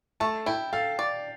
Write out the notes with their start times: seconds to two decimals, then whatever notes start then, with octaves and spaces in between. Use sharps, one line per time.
0.20 A3 A5
0.46 E4 G5
0.73 A4 F5
0.99 D5